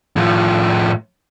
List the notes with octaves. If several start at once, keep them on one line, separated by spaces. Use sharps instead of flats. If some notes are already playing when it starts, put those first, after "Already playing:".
A2 F3